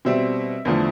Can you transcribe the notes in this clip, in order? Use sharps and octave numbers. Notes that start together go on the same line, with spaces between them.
B2 G3 C4 E5
E2 D3 F3 A3